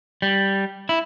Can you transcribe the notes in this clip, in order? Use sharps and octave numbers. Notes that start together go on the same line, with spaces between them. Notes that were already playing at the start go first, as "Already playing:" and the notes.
G3
E4